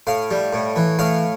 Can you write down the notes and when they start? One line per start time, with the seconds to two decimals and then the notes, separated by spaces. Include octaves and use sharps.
0.07 A2 F5
0.31 G3
0.53 A2
0.76 E3
0.99 A2 F5